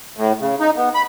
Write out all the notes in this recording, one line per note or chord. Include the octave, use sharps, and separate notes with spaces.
A2
C#3
D#4
B3
B5